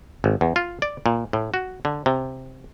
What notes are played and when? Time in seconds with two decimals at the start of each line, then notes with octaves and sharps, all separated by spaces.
0.24 G#1
0.41 E2
0.56 F4
0.82 D5
1.06 A#2
1.33 A2
1.54 F#4
1.85 D3
2.06 C3